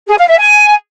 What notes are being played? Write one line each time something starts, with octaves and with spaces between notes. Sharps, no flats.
G#4
F5
E5
G#5